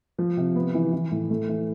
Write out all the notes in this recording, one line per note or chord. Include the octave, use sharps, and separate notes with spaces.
F3
C3
B3
E3
E3
A2
A3
E3